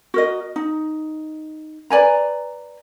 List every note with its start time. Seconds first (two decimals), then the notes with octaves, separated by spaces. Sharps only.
0.14 F#4 A#4 D#5
0.56 D#4
1.90 B4 D5 G#5 A#5